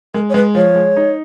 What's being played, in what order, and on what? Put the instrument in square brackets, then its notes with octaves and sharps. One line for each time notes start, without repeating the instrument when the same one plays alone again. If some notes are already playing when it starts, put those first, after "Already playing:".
[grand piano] G#3 [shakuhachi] A#4
[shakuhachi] C#5
[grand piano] G#3 [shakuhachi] B4
[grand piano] F3 [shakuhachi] C#5
[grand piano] G#3
D#4